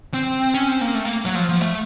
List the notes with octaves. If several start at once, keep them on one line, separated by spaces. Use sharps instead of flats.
C4
C#4
C4
A#3
A3
A#3
F#3
F3
F3
A3